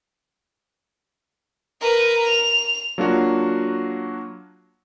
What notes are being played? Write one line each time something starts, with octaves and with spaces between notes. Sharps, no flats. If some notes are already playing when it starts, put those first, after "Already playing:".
A#4 B4
F7
F#3 A#3 D4 F4 F#4